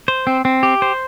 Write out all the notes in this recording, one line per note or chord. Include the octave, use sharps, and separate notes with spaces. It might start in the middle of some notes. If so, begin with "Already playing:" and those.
C5
C4
C4
G4
C5